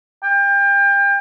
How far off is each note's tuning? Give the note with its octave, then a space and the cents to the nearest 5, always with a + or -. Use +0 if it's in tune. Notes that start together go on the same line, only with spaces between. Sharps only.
G5 +30